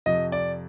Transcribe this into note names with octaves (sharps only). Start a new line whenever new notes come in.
F2 C3 F3 D#5
D5